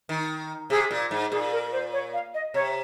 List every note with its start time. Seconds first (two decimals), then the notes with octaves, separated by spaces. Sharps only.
0.09 D#3
0.70 C3 G#4
0.91 A#2
1.11 G#2
1.31 A#2 G#4
1.52 A#4
1.72 C5
1.93 C#5
2.13 F5
2.34 D#5
2.54 C3 C#5